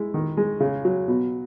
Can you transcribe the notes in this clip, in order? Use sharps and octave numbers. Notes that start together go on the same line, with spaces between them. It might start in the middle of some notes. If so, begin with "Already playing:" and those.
Already playing: G#3 E4
D#3
G#3
C#3
F#3
B2